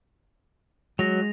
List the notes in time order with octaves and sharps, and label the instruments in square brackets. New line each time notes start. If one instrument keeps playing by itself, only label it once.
[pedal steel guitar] F#3 [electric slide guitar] G#3 [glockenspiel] A#6 F7